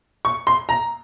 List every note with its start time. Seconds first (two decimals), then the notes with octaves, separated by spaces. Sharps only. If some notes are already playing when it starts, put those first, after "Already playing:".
0.25 C#6
0.47 C6
0.69 A#5